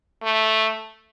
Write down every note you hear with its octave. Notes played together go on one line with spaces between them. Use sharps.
A3